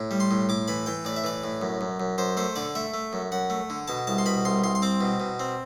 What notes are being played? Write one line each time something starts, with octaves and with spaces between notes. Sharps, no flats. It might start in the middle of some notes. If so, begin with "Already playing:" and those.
Already playing: A2
G3
C6
A2
A2 D6
E3 B5
E3 G5
A2 D5
E5
E3 D5
A2
F#2
F#2
F#2
F#2 C5
A3 C5
D3 D5
A3 E5
A3
F#2
F#2 F#5
A3
D3
B2 A5
C2 A5
C6
B2 B5
C2 C6
C2 C6
C6
C4 D6
B2
B2
C4